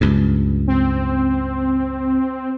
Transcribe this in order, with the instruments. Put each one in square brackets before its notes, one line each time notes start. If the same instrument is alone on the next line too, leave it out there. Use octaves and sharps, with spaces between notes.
[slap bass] C#2 G2
[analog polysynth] C4